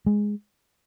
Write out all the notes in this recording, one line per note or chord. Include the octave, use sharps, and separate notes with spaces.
G#3